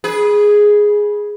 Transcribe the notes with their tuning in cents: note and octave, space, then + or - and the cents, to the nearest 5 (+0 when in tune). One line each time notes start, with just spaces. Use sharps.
G#4 +0 B4 -15